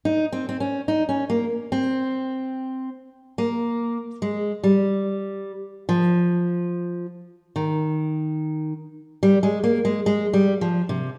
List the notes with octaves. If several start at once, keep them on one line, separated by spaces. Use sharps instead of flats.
D#4
C4
C4
C#4
D#4
C#4
A#3
C4
A#3
G#3
G3
F3
D#3
G3
G#3
A#3
G#3
G#3
G3
F3
C3